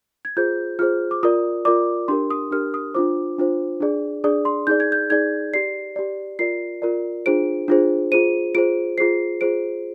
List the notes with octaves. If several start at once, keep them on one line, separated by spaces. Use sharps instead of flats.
G#6
F4 G#4 C5 G6
F4 G#4 C5 F6
D6
F4 A#4 D5 D#6
F4 A#4 D5 D6
D4 G4 A#4 C6
D#6
D4 G4 A#4 F6
D#6
D4 F4 C5 D6
D4 F4 C5
D4 G#4 D5
D4 G#4 D5 D#6
C6
D#4 G#4 D5 G6
G#6
G6
D#4 G#4 D5 G#6
G4 D5 C7
G4 D5
F4 A#4 D5 C7
F4 A#4 D5
D4 F4 G#4 C5 D7
D4 F4 G#4 C5
F4 G#4 C5 D#7
F4 G#4 C5 D7
F4 G#4 C5 C7
F4 G#4 C5 D7